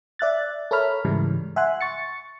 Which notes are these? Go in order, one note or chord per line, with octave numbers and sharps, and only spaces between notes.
D5 E5 F#6 A6
A4 A#4 C#5 E5 B5 F6
G#2 C#3 E3 G3 G#3
E5 F#5 G#5 C6 F#6
C#6 A6 C#7